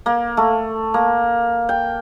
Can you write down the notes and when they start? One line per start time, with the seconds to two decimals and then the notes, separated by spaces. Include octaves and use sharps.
0.06 A#3
0.37 A3
0.94 A#3
1.69 G5